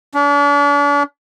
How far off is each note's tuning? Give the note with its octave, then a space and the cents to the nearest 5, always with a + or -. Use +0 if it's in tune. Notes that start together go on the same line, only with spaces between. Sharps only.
D4 -40